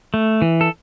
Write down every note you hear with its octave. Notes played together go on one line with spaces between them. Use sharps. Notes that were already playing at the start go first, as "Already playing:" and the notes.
A3
E3
A4